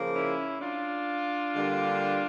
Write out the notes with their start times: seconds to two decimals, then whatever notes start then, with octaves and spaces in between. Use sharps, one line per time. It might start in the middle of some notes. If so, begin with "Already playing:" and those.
Already playing: C#3 F3 A#3
0.15 C#4 E4
0.61 D4 F4
1.56 D3 G3 A#3